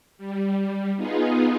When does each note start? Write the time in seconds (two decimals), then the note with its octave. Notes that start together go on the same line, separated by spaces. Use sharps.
0.18 G3
0.96 B3 D#4 F4 G#4